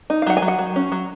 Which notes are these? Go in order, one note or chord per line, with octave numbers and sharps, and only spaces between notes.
D#4
F5
F#3 F#5
G#5
F#3
F#5
F#3
C#4
F#3